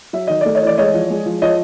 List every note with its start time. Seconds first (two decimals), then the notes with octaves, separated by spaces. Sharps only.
0.13 F#3 E5
0.27 D#3 D#5
0.41 A3 D5
0.55 C#5 D#5
0.62 E3 D5
0.78 G#3 C#5 D#5
0.94 F3
1.10 G#3
1.26 F3
1.42 F3 C#5 D#5